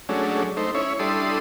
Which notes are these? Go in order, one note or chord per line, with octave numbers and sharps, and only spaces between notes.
F#3 G#3 A3 C#4 D4
A3 D#4 C5
C#4 E4 C#5
G3 D4 E4 A4 C6 D#6